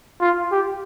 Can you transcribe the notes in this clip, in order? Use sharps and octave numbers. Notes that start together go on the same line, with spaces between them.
F4
G4